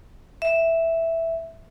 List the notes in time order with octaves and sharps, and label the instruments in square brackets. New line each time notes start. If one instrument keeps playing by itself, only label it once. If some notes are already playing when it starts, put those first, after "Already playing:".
[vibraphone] E5